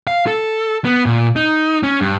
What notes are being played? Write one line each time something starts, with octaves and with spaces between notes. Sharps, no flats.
F5
A4
B3
A#2
D#4
C#4
G2